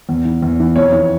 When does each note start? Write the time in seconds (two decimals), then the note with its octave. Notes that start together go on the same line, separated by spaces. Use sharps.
0.09 E2
0.25 E3
0.42 E2
0.60 E3
0.76 F2 C#5
0.92 E3